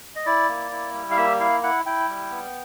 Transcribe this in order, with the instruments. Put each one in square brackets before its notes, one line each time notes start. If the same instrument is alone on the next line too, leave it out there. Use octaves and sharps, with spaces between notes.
[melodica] D#5
E4 D5
A#3
E4
G3
F5
A#3 E5
E4 F5
E4 F#5
E4 G5
G3
B3